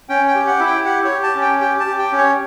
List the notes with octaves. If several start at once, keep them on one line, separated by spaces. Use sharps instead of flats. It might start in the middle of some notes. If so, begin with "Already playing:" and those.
C#4 G5
G5
G4
F#5
E4
G5
G4 F#5
C#5
G4
A5
C#4
G5
G4 G5
A5
G4
G5
C#4
C#5